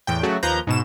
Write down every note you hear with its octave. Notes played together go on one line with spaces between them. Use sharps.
E2 A2 G5
C#3 F#3 A3 F#4
D#2 F3 A#3 B4 A#5 G6
G#2 B2 E7